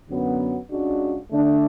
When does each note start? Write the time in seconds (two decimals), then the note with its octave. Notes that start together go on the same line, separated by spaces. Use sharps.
0.09 F#2 D3 F#3 B3
0.69 C#2 C#3 G#3 D4 F#4
1.30 D3 A3 D4